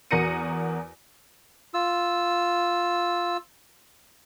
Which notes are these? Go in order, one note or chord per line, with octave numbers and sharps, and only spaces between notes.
E2 F#4 A#4 A#6 C#7 D#7
F4 E6